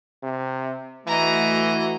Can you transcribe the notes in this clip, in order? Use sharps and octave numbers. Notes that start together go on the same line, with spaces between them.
C3
E3 A3 F#4 D#5 A#5